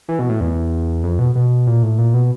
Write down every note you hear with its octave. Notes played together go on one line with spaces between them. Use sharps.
E3
B2
A2
E2
F2
B2
B2
A#2
A2
A#2
B2